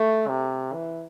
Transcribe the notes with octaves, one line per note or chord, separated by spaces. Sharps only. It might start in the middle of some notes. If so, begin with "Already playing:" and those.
Already playing: A3
C3
E3